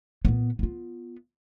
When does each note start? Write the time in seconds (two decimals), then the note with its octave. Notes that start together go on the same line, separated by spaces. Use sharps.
0.25 A#2 B3
0.59 B3 F4